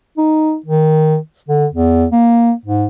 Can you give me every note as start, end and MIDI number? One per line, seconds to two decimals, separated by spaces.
0.18 0.56 63
0.66 1.18 51
1.49 1.66 50
1.73 2.05 40
2.12 2.52 58
2.66 2.87 44